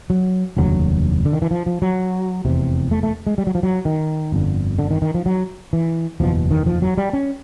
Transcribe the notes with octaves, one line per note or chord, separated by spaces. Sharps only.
F#3
F1 D#2 D3 F#3
D3
D#3
E3
F3
F3
F#3
F1 E2 C3
A3
A3
G#3
G3
F#3
F3
F#3
D#3
G1 F2 D3
D3
D#3
D#3
F3
F#3
E3
F#1 E2 B2 F3
D#3
F3
F#3
G3
C#4